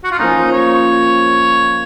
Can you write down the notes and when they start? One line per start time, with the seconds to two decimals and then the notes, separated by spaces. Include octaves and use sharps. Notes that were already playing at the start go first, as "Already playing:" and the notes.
0.04 F#4
0.11 F4
0.19 F3 A#3 C#4 D#4
0.52 C#5